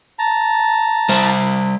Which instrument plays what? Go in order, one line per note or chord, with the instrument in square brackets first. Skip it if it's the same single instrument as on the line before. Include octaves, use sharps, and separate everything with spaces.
[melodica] A5 A#5
[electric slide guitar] G3 C5 E5